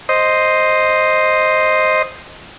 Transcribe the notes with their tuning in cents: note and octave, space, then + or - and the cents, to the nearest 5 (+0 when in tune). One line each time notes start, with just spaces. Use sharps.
C5 +0 D#5 +0